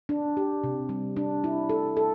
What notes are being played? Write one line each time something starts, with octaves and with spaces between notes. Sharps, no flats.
D4
G4
C3
G3
D4
E4
A4
A4